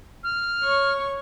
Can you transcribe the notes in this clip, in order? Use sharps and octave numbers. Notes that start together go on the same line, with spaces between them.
F6
C#5 C#6